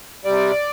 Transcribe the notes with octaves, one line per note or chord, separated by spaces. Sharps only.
C3 G3 D5